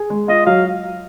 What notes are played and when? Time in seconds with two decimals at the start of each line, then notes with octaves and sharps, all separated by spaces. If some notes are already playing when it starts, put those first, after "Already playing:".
Already playing: G#4
0.10 G#3
0.28 F4 D#5
0.46 F#3 F5